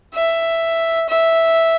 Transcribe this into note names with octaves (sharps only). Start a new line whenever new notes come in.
E5
E5